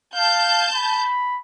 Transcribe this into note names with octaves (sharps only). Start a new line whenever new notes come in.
F5 A5 G6
B5